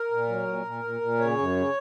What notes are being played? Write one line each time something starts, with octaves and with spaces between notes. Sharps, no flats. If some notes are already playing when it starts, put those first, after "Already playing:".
Already playing: A#4
A#2
F#3
A#2
A#2
A#2
A#2
C#3 C#5
F#2
C#3